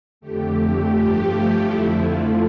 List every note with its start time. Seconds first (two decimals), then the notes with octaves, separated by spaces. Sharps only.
0.21 F2 D3 A3 G4
0.91 G2 F3 A3
1.62 F2 D3 F3 A3 E4
1.97 F4